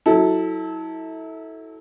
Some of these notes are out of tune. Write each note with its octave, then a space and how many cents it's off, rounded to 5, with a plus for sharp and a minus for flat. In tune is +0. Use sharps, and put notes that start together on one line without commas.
F#3 +0 E4 -30 A4 +0